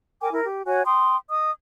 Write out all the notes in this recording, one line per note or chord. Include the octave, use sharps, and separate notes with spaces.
A#4 G5 G#5 D6
E4 A#4
G4
F#4 C#5 F#5 G#5
G5 C6 D#6
D#5 D#6